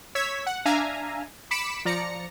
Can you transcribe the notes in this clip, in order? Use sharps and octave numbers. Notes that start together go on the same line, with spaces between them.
C#5 E6 G#6 B6
F#5
D4 E5 F5 G#5 A#5
B5 D6 B6 C#7 D7 E7
F3 D5 A#5 A#6 C#7